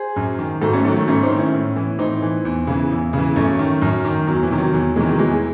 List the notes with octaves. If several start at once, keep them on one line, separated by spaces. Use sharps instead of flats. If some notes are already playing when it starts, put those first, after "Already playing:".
Already playing: G#4 C5
F#2
D#3
G#2 F#4 A4
A3 C#4
D#3 F#3 A3
F#3 A3
G#2 A3 C#4
C4 D#4
D#3
C#4 E4
A2
E3
A2 C4 D#4
E3
E2
C#3 E3
E2
C#3 E3
F#2 A3 C#4
D#3
F#2
D#3
E2 F#3
E3
C3 D#3
F#3
E2 F#3
C3 D#3 E3 G#3
F#3
E2 E3 G#3